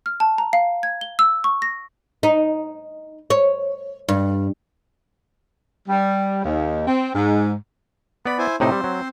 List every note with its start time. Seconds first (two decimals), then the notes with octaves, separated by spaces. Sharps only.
0.06 F6
0.20 A5
0.38 A#5
0.53 F5
0.83 G#6
1.01 G7
1.19 E6
1.44 C#6
1.62 A#6
2.23 D#4
3.30 C#5
4.08 G2
5.89 G3
6.45 D#2
6.87 C4
7.15 G#2
8.26 B3 D5 B5
8.39 E4 C5 G#5
8.60 A2 C3 C4 D#4 C5
8.72 G3
8.84 F#3